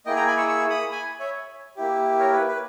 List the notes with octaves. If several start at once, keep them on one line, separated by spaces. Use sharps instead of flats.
A#3 E4 G#4 D#5 G5
G5 A#5
G#5 B5
C#6 E6
C#6 E6
B5 D#6
G#5 B5
C#5 E5
A#3 E4 G4
A#4 C#5
B4
B4